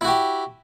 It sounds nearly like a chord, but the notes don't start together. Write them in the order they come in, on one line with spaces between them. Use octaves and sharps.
E4 F#4 G4